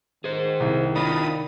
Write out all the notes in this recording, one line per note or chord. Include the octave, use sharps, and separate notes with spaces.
D#3 G#4 C5
C2
D4 D#4 F4 B5 D#6